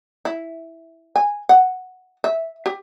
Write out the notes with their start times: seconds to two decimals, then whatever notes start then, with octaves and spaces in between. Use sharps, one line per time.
0.25 E4
1.16 G#5
1.49 F#5
2.24 E5
2.66 G4